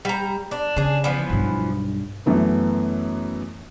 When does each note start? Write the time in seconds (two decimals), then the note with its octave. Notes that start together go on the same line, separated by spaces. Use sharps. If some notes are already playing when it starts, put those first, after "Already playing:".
0.05 G3 A#5
0.51 D4
0.76 C#3 D4 G#4
1.04 E3 F3 B3
1.30 B1 G2
2.26 F#2 E3 A3 B3